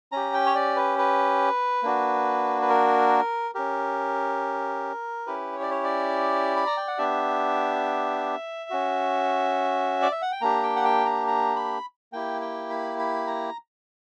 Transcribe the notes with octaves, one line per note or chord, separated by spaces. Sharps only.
C#4 G4 A#5
G5
C#5
D5
B4
B4
A#3 D4 F#4
B4
A#4
C#4 G4 A#4
C#4 E4 G4 B4
C#5
D5
C#5
D5
B5
A#5
G5
F#5
B3 D4 G4 E5
C#4 F#4
D5
E5
F#5
G5
A#3 D4 G4 A#5
G5
F#5
G5
A#5
A#5
B5
A#3 E4 G4 G5
G5
B5
B5
A#5